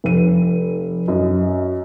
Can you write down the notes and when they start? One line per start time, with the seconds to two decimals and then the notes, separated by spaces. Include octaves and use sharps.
0.04 F1 D#7
1.08 F#2 D#5